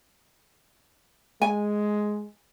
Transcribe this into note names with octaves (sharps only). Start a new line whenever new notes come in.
G#3 G#5